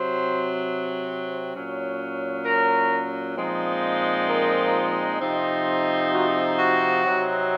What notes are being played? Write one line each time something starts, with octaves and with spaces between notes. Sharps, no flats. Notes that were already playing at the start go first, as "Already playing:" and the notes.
Already playing: C3 F#3 C4 C5
A#2 F#3 C#4
A#4
A#2 F3 G#3 C4 D#4
A#4
C3 F3 C4 D#4
F#4
F#4
C3 F#3 C4 D#4